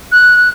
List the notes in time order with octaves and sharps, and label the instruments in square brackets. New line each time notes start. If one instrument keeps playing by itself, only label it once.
[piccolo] F#6